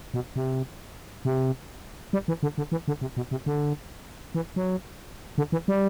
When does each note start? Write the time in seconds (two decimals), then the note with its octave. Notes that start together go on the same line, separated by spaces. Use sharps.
0.14 B2
0.36 C3
1.25 C3
2.13 G3
2.28 E3
2.43 D3
2.58 D3
2.72 E3
2.88 D3
3.01 C3
3.17 B2
3.31 C3
3.46 D3
4.35 E3
4.56 F#3
5.38 D3
5.52 E3
5.68 G3